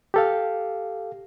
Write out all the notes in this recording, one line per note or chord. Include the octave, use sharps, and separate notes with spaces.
G4 A4 F5